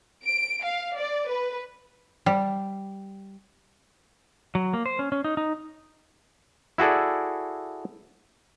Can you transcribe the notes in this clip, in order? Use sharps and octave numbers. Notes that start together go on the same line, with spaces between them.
D7
F5
D5
B4
G3
F#3
A#3
C5
C#4
C#4
D#4
D#4
E4 F#4 G#4 A4 D5